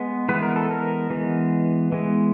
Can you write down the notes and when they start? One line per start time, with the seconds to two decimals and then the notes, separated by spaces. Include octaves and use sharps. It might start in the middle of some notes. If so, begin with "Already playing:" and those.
Already playing: G#3 B3
0.29 E3 G#3 B3 B4
0.43 A#4
0.56 A4
0.71 A#4
1.10 E3 G#3 B3
1.92 E3 G#3 B3